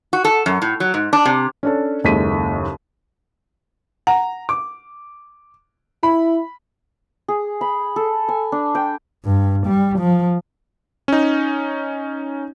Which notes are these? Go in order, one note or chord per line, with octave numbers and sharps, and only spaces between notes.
F#4
A4
F#2
A2
F#3
G#2
D4
C3
C#4 D4 A4
F#1 D#2 G#3 A4 B6 D#7
F#5 A#5
D6
E4 B5
G#4
B5
A4
G#5
D4
G5
G2
G3
F3
C#4 D#4